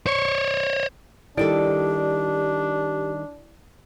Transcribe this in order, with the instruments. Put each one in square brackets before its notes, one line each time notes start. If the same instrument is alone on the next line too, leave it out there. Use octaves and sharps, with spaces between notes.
[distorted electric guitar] C5 C#5
[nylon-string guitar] D#3 G3 A4 [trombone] D4 [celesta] E4 D5 D7 [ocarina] G4